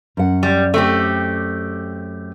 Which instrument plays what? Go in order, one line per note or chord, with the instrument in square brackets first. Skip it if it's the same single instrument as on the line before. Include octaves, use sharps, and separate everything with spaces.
[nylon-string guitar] F#2 F#5
[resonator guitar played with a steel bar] G3
A3 C4 G4